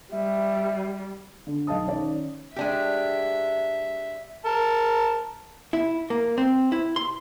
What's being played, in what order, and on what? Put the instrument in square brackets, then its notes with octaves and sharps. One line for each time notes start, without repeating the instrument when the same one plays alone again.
[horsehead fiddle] G3 [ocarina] E5
[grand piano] D3
B1 D#5 F5 A5 D#6
D#3 C#4 D5
[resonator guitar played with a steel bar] G#3 D4 G4 [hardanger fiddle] E5
[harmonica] A#4 A5
[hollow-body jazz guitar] E4
A#3
C4
E4
C6